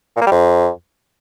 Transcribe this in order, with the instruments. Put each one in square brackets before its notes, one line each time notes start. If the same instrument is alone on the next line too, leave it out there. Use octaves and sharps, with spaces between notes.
[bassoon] A#2
A#3
G3
F2